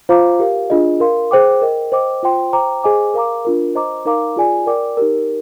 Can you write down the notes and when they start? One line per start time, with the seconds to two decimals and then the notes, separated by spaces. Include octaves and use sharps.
0.09 F4 C5 F5 A#5 D6
0.39 G4 A#4 F5
0.70 D4 F4 G#4 D#5
1.00 A#4 F5 C6
1.31 G#4 C5 G5 D6
1.61 A#4 D#5 G5
1.92 C5 D#5 G5 D6
2.23 F4 C5 G5 C6
2.53 C5 G5 A#5 D6
2.84 G#4 C5 D#5 G#5 D6
3.14 A#4 F5 A#5 D6
3.45 D4 F4 A#4
3.75 C5 D#5 A#5 D6
4.05 D#4 A#4 F5 A#5 D6
4.36 F4 G#4 D5 G#5
4.66 A#4 D5 G5 D6
4.97 D#4 G4 A#4